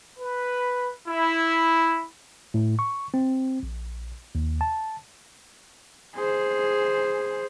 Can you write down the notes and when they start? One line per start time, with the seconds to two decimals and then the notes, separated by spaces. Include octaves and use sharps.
0.19 B4
1.09 E4
2.54 A2
2.79 C#6
3.14 C4
3.63 A#1
4.35 D#2
4.61 A5
6.16 G#4 C5